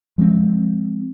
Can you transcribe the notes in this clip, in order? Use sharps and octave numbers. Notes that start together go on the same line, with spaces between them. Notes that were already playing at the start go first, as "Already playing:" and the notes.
F3 G#3 A3 C4